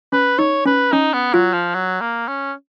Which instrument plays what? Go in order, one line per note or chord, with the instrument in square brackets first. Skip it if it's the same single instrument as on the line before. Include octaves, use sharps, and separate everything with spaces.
[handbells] C#4 [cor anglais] B4
[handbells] D#4 [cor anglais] C#5
[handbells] C#4 [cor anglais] B4
[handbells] C#4 [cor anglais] D#4
[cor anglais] B3
[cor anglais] F#3 [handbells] F4
[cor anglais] F3
F#3
A#3
C#4